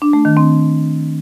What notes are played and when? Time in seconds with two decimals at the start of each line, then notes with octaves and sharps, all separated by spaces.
0.02 D4
0.13 A3
0.25 D#3
0.37 C4